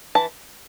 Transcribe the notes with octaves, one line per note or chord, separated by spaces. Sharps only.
E3 A5